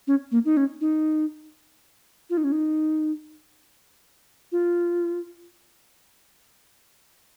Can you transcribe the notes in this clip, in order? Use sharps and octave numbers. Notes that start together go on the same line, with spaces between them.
C#4
A#3
D#4
C#4
D#4
F4
D#4
C#4
D#4
F4